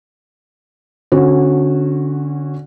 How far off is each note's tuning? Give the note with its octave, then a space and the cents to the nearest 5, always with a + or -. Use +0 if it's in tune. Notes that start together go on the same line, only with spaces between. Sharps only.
D3 -5 C#4 -30 F#4 +0